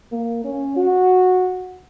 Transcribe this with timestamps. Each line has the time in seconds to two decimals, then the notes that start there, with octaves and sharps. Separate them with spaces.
0.12 A#3
0.44 C#4
0.76 F#4